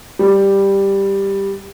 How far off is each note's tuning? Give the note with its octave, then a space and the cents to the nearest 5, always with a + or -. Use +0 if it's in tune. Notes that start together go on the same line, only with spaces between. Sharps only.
G3 +5